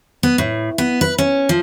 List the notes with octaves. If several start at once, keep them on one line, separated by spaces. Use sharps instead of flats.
B3
A2
B3
B4
C#4
F3